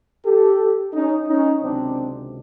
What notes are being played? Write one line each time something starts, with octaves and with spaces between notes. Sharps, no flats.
G4 A4
C#4 D#4
C#4 D#4
C#2 C3 D#3 F#3 C4 D4